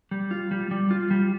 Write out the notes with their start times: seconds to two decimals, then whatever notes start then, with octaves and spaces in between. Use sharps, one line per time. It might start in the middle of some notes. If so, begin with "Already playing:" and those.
0.11 G3
0.31 F4
0.51 G3
0.71 G3
0.91 F4
1.11 G3